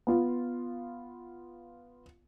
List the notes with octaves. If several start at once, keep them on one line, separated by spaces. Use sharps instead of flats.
B3 F4